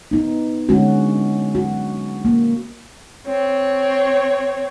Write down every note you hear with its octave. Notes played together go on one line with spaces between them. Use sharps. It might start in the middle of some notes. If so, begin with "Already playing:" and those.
B3 D#4
D3 G#3 C#4 F#4
F#4
A#3
C4 C#5